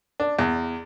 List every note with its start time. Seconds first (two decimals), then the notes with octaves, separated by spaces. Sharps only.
0.20 D4
0.39 E2